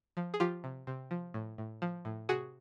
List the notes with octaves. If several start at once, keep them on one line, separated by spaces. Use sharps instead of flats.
F3
G#4
F3 F4 G4
C3
C3
F3
A2
A2
F3
A2
C3 F#4 G#4